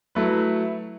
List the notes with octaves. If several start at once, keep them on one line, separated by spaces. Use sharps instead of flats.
F#3 A3 E4 B4